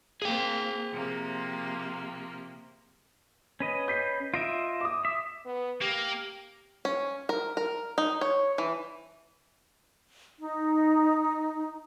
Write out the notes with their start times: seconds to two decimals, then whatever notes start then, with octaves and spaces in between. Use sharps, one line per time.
0.22 A#3 C4 G#4 G5
0.92 C3 F3 A#3
3.60 C#4 B4 D#5
3.88 G6 B6 C7
4.34 F4 D#5 E5 D7
4.81 D6 D#6
5.05 E5
5.46 B3
5.82 A#3 G4
6.85 C#4
7.29 A#4
7.57 A#4
7.98 D#4
8.21 C#5
8.58 E3
10.39 D#4